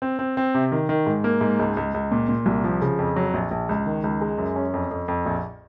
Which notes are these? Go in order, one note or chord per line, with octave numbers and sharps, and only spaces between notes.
C4
C4
C4
C3
D#3
D#3
G#2
A#3
G#2
C#2
C#2
C#2
A#2
A#2
C2
F3
C#3
F2
F#3
A#1
A#1
C#2
D#3
C#2
G#3
F#2
C#4
F2
F2
F2
A#1